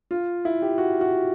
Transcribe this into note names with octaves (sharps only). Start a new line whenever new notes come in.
F4
E4
G4
F#4
F#4